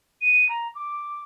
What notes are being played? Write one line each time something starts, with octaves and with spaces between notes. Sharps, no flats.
D#7
A#5
D6